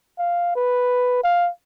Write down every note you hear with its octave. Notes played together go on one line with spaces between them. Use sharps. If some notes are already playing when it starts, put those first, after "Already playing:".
F5
B4
F5